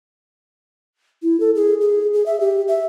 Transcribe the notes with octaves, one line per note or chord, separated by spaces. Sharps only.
E4
A4
G#4
G#4
G#4
E5
G4
E5